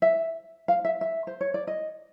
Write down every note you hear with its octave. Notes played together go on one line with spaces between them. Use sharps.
E5
F5
E5
E5
C5
C#5
D5
D#5